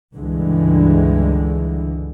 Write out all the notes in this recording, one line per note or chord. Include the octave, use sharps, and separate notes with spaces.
C#2 G2 D3 E3 G#3